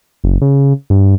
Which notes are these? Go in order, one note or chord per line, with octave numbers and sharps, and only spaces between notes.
F#1
C#3
G2